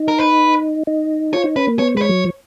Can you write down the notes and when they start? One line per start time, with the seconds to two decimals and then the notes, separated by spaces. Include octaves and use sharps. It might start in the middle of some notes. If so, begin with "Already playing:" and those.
Already playing: D#4
0.08 A#4
0.19 B4
0.87 D#4
1.33 F4 C#5
1.44 D#4
1.56 C#4 B4
1.67 A#3
1.79 B3 C#5
1.95 G#3 B4
2.02 C#5
2.09 F#3
2.24 F3